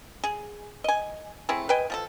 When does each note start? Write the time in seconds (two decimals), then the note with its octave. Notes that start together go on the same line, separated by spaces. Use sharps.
0.24 G#4
0.84 D#5 G#5
1.49 A3 C4 E4 G#4
1.69 B4 D#5 G5 G#5
1.90 F3 G#4 A4